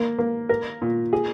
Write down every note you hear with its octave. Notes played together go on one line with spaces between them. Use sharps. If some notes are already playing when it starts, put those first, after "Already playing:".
Already playing: A#3
A#3
A#4
A#2
G#4